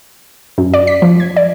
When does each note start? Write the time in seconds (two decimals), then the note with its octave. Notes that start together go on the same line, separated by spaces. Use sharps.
0.58 F#2
0.74 D5
0.87 B6
1.02 F3
1.20 G#6
1.37 D5